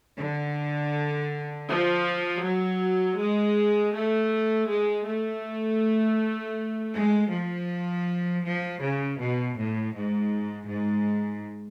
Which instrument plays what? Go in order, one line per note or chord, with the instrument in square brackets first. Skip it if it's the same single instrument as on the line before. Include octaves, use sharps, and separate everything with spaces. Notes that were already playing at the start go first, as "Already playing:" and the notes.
[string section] D3
F3
F#3
G#3
A3
G#3
A3
G#3
F3
F3
C#3
B2
A2
G#2
G#2